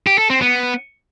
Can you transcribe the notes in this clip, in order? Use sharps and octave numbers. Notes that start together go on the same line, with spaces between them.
G4
A4
C4
B3